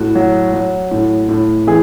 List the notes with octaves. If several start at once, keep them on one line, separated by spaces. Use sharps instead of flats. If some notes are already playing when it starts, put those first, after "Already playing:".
Already playing: A2 F#4
F#3
F#3
A2
A2
E3 G#4